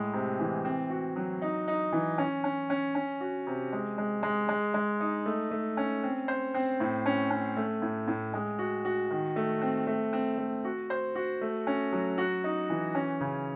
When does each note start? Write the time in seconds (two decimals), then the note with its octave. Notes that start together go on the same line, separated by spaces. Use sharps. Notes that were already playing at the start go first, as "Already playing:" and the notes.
Already playing: A2 G#3
0.13 C3
0.39 E3
0.65 C4
0.90 F#4
1.16 F#3
1.42 D#4
1.68 D#4
1.92 E3
2.18 C#4
2.44 C#4
2.70 C#4
2.95 C#4
3.21 F#4
3.47 C3
3.73 G#3
3.98 G#3
4.23 G#3
4.49 G#3
4.74 G#3
5.00 D#4
5.26 A3
5.51 A3
5.77 C#4
6.03 C4
6.28 C5
6.54 C4
6.80 A2
7.06 C#4
7.30 C#4
7.56 A3
7.82 A2
8.08 A2
8.33 G#3
8.59 F#4
8.85 F#4
9.10 D#3
9.36 A3
9.61 C4
9.87 A3
10.13 C4
10.38 A3
10.64 F#4
10.90 C5
11.15 F#4
11.41 A3
11.67 C#4
11.92 F#3
12.18 F#4
12.44 D#4
12.70 E3
12.95 C#4
13.21 C#3